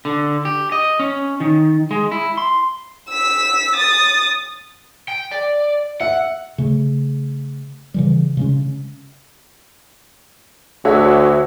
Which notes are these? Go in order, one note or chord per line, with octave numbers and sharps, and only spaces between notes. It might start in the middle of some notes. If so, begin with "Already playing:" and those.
D3
G4
D#5
C#4
D#3
G#3
E4
C6
E6 B6
D#6 A6
G5
D5
E5 F#5
C#3 A3
C#3 E3 G3
C#3 G#3 C#4
D2 F#4 C#5 E5